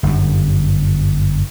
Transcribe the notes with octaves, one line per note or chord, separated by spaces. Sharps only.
G1 F#2